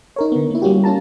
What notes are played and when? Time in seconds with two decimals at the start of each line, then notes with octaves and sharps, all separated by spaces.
0.16 D#4 A#4 C#5
0.32 D3 B3
0.50 A#3 E4
0.62 G3 A#3 C#4 F#4 G4
0.84 C#4 F4 A5 A#5